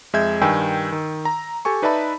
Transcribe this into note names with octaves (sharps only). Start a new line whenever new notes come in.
F2 G#3 E5 G6 G#6
G2 D#3 G5 G#5 E6
D#3
A#5
G4 A4 G#5 C#6
D#4 B4 D5 E5 A5 B5